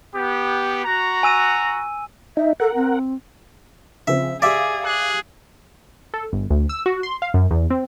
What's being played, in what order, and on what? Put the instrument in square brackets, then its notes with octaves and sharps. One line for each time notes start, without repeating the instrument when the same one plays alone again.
[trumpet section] B3 G4
F#4 A#5
[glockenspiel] G#5 E6 D#7
[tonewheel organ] D#4 [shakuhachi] E5
[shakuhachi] A4 [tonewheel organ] A#4 F#5
[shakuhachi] C4
[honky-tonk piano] C#3 F3 C4 [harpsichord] E5
[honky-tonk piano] G4 F5 [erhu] G#4 [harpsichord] D5 E5
[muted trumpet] G#4 [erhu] F#6
[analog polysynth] A4
G1
D2
E6
F#4
C6
F5
F#2
E2
C4